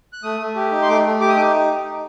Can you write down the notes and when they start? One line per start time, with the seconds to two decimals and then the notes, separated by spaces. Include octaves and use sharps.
0.13 F#6
0.23 A3 D#6
0.40 A3
0.56 G4
0.71 D#4
0.82 C6
0.88 A3 D6
1.04 A3
1.20 G4 D6
1.29 D#6
1.36 D#4 D6